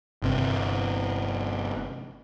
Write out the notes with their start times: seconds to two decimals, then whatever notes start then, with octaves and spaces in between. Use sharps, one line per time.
0.22 G1 C3